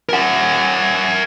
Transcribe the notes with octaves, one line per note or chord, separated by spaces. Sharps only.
A#4 F#5